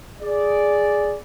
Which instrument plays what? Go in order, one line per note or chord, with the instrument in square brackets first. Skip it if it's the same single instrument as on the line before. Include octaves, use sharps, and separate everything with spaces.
[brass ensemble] G#4 D5